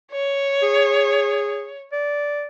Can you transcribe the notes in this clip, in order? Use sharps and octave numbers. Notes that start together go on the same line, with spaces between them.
C#5
G#4
D5